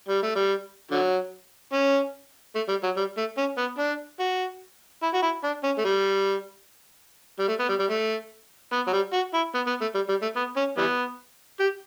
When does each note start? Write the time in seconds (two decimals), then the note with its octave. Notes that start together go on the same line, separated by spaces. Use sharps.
0.08 G3
0.22 A3
0.35 G3
0.91 D3 F#3
1.73 C#4
2.55 A3
2.69 G3
2.83 F#3
2.97 G3
3.17 A3
3.38 C#4
3.58 B3
3.79 D4
4.20 F#4
5.03 E4
5.14 F#4
5.23 E4
5.44 D4
5.63 C#4
5.78 A3
5.85 G3
7.39 G3
7.48 A3
7.60 B3
7.69 G3
7.79 G3
7.90 A3
8.72 B3
8.87 F#3
8.93 G3
9.13 F#4
9.34 E4
9.55 B3
9.67 B3
9.81 A3
9.95 G3
10.09 G3
10.22 A3
10.36 B3
10.57 C#4
10.78 E3 G3 B3
11.60 G4